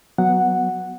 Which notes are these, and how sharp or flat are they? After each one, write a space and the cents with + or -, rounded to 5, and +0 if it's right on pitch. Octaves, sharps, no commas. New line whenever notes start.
F#3 -5 B3 +0 F#5 -5